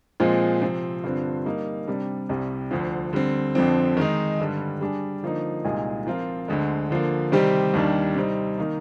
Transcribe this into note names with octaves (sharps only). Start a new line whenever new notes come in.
A#2 F3 G#3 C4
C3 F3 C4
G2 D3 F3 C4
G3 A#3 D#4
C3 G3 D4
C2 C3 G3
D2 D3 F3
D3 G3 C4
F2 D3 F3 C4
D#3 G#3 D#4
G2 D3 G3
G3 D4 G#4
D3 F3 A#3 D#4
C2 A#2 G#3 D#4 G#4
F3 C4 F4 A#4
D2 D3 G#3
D3 F3 A#3
C3 D#3 G3 C4 G4
D#2 D#3 G3 D4
C3 G3 C4 D#4
D#3 A#3 D#4